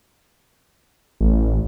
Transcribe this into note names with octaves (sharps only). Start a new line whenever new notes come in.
A1